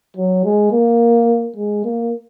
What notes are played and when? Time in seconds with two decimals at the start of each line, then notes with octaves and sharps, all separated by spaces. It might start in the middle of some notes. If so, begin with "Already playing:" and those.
0.17 F#3
0.45 G#3
0.72 A#3
1.56 G#3
1.85 A#3